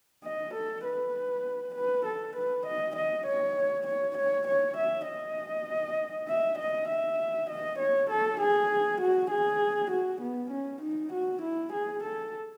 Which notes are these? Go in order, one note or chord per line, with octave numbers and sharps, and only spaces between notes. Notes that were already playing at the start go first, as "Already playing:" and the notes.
D#5
A4
B4
B4
A4
B4
D#5
D#5
C#5
C#5
C#5
C#5
E5
D#5
E5
D#5
E5
D#5
C#5
A4
G#4
F#4
G#4
F#4
B3
C#4
D#4
F#4
E4
G#4
A4